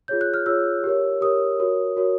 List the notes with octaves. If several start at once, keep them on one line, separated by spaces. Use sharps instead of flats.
F4 G#4 C#5 G6
F#6
F6
F4 G#4 C#5 E6
G4 A#4 C#5
G4 A#4 C#5 D#6
F#4 A#4 C#5
F#4 A#4 C#5